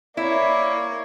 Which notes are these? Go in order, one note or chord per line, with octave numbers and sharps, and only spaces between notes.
A#3 E4 C#5 D5